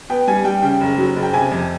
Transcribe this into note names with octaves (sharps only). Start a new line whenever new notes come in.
B3 G5
G3 G#5
G3 G5
C#3 G5
F#1
F#3
F#1
G5
C3 G#5
F2